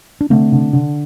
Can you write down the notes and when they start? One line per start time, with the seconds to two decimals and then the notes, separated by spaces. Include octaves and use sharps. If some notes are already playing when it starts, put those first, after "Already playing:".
0.21 D4
0.30 D3 A3 C4
0.52 D3
0.73 D3